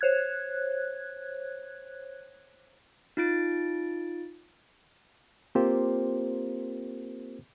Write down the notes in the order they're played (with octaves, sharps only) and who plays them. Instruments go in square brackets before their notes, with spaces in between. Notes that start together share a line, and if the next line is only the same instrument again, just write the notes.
[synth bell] C5 C#5 F#6 G#6
[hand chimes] D#4 F4 A6 D7
[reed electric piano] A#3 C4 F4 G4 A#4 C5